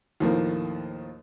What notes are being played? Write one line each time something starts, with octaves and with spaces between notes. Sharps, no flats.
D#2 A2 F3 A#3